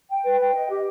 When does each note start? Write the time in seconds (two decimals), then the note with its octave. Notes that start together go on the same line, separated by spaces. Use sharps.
0.09 G5
0.24 B4
0.40 G5
0.54 D#5
0.70 G4